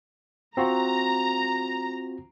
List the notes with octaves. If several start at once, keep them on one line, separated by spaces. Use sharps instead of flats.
C4 F4 F#4 A#5